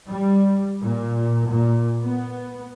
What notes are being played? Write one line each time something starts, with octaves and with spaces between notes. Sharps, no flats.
G3
A#2
A#2
B3